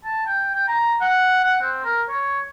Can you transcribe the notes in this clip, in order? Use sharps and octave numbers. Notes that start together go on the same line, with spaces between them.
A5
G5
G5
A#5
F#5
F#5
C4
A#4
C#5